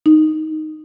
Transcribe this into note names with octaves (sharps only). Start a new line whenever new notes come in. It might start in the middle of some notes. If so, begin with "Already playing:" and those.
D#4